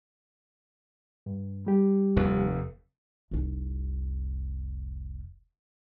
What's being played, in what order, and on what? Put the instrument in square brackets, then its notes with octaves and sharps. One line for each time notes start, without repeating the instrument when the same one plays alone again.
[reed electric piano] G2
G3 G4
[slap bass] F1 D#2
[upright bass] F1 C2